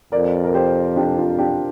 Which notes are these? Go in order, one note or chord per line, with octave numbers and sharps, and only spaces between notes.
F2 A#4 D5
A#4
G4 C5
D4 G4
F4
D4 G4